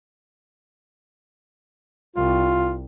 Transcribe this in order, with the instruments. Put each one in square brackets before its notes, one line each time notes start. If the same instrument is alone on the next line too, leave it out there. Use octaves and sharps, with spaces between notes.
[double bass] C2 [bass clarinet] F4